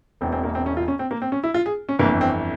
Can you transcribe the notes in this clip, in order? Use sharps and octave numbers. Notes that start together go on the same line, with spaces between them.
E1 E2 E3 C4
C4
A#3
C4
C#4
F4
C#4
C4
A#3
C4
C#4
E4
F4
G#4
C#4
G1 F2 E3 A#3
C4